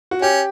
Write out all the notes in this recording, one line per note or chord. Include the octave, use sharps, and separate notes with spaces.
F#4
C#4 G4